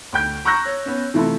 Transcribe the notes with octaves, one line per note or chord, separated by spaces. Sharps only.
D2 G5 G6 D7
A#5 C#6 E6 F#6 G6 A#6
C#5
B3 C#4
C3 E3 A3 E4 F4 A4